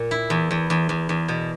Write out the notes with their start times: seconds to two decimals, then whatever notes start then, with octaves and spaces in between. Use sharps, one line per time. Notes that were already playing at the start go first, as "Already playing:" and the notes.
Already playing: A#2
0.11 E4
0.30 E2
0.51 E2
0.70 E2
0.89 E2
1.09 E2
1.28 B2